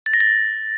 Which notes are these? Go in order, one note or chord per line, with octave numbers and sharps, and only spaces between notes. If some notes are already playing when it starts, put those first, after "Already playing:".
A6
A#6
A6